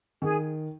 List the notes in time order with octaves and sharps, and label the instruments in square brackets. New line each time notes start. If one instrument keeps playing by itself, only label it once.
[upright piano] D#3 [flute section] G#4